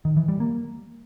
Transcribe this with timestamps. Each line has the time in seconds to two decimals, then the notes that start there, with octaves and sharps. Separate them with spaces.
0.05 D#3
0.17 E3
0.28 G3
0.40 A#3